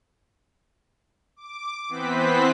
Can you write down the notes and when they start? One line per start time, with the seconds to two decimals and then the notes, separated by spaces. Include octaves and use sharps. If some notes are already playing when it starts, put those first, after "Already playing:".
1.36 D6
1.89 E3 B3 C4 B4 C5 B6